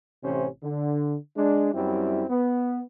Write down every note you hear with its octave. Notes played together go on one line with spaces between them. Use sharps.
A1 C3 E3 C#4 C5
D3
G#3 D4
F#2 G3 C4 E4
B3